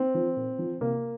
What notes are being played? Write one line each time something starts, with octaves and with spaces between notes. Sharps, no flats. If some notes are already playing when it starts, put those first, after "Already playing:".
Already playing: C4
F3
A#2
F3
C3 A#3